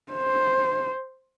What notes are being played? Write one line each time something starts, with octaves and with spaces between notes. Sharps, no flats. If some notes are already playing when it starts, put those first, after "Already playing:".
C5